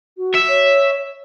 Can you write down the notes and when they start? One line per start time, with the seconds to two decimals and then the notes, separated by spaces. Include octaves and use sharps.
0.18 F#4
0.34 E5
0.48 C#5